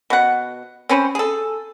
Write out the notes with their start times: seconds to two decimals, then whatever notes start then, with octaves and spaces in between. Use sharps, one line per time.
0.10 B2 F#5
0.89 C4 C#4 B4 C5
1.15 G#4 A4